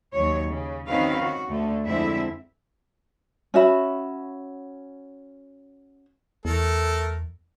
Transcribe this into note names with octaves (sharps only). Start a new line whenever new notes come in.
D#2 F#3 C#5
C#3
D#3 C4 C#4 F#4 B4 F5
D#3 F#4
D2 D3 A3
F2 D3 G#3 C4 E4 E5
C#4 F#4 E5 B5
E2 A3 A4 A#4